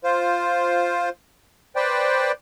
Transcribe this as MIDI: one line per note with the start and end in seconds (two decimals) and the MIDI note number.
0.04 1.09 65
0.04 1.09 72
1.76 2.32 71
1.76 2.32 72
1.76 2.32 74
1.76 2.32 79